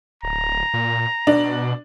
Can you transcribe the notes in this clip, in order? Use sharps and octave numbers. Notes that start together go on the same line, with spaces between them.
D1 A#5
A#2
B2 D4